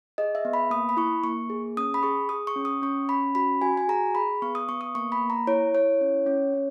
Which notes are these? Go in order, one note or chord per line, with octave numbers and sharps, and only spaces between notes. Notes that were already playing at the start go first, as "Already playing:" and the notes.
G#4 D#5
E5
B3
B5
A#3 D#6
B5
E4 C#6
A#3 C#6
G#4
C#4 D#6
B5
G#4 C#6
G#4 D#6
C#6
C#4
D#6
C#4 C#6
C#4 B5
F#4 B5
F#4 G#5
G#5
G#4 A#5
G#4 B5
B3 C#6
D#6
B3 C#6
D#6
A#3 C#6
B5
A#3
A#5
E4 C#5
E4 C#5
C#4
C#4
C#4